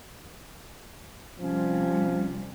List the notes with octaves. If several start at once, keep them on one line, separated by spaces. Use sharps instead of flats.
C3 F3 G3 C#4